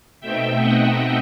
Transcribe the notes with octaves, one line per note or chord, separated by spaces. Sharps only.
B2 A3 C4 D#4 E5 G5
D#5 F#5